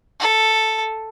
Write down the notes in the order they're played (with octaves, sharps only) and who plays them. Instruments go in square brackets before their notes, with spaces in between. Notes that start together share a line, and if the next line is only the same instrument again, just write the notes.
[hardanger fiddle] A4